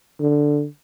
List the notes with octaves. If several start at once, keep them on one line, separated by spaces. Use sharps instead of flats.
D3